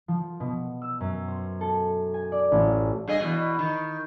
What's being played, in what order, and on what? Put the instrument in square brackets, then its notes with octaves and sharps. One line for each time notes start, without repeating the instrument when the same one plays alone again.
[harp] F3
B2
E6
F#2
C5
A4
G#5
D5
A1
F4
[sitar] G2 G#4 D#5
E2 B2
D#3